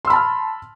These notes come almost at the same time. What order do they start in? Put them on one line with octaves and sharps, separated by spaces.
C6 E6 B5 A5 F6